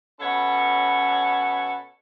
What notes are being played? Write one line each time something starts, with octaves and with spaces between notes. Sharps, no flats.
B2 C#4 A4 C#5 F#5 B5